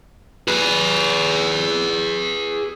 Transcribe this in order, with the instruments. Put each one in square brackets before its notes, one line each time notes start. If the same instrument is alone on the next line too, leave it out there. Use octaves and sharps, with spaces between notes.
[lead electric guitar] G#4 B4